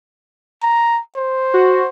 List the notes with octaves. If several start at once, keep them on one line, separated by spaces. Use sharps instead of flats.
A#5
C5
F#4